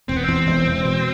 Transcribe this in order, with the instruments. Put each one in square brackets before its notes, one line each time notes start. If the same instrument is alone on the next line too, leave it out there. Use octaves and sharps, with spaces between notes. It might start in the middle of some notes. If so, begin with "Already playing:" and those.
[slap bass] E1 [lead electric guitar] C4
[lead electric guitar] B3
[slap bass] E2 [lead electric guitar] C4
[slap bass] E1
E1
B2